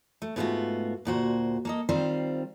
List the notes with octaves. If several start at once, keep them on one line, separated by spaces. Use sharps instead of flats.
A3
G#2 A3 B3 D#4 F4 F#4
D2 A#2 F#4 C5
A#3 A4 D#5
D#3 G3 C4 F4 C5